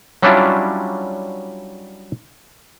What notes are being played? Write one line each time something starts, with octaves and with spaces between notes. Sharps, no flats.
F#3 G3 C#4 D4 E4 F4